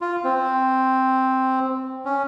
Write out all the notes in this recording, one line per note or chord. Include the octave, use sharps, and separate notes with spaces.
F4
C4
C#4